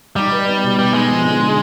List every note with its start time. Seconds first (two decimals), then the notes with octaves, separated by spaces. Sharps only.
0.16 G3 D#4
0.32 B4
0.48 B3
0.63 B2
0.78 G3 B3
0.94 G#3 D#4
1.10 F3
1.24 D3
1.41 D4